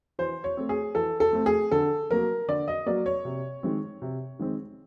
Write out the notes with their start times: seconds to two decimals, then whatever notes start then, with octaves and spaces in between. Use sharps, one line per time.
0.19 E3 C5
0.44 C#5
0.57 A3 C4
0.69 G#4
0.95 E3 A4
1.20 A4
1.33 A3 C4
1.46 G#4
1.71 D3 A4
2.10 F#3 A#3 A#4
2.48 D3 D5
2.68 D#5
2.86 F#3 A#3 D5
3.06 C#5
3.25 C3
3.63 D#3 G#3 C4
4.02 C3
4.39 D#3 G#3 C4